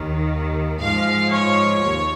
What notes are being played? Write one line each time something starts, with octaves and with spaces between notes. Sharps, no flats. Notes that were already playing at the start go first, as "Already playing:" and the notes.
Already playing: D#2 D#3
G#2 F3 F5
C#5
D#2